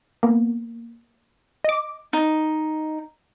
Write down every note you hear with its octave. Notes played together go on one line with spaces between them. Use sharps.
A#3 B3
D#5 D6
D#4